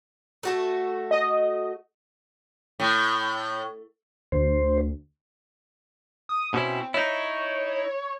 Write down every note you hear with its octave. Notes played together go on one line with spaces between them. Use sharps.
A3 F#4 A4
D#5
A2
D2 C5
D#6
B2 C4 C#4 E4
D#4 E4 C#5